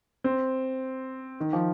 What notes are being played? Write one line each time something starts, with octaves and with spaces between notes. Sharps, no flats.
C4
D#3
F3